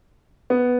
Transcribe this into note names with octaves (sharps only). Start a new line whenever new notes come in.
B3